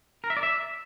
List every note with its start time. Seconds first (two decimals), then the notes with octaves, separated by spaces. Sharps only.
0.24 A#4
0.30 E5
0.37 D5
0.43 E5